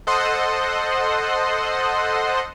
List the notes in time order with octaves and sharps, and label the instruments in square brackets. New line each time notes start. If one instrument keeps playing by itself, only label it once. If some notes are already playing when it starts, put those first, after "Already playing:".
[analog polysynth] A4 C5 D#5 F#5 C6